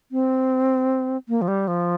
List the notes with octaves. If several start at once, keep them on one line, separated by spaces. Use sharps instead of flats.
C4
A#3
F3
G3
F3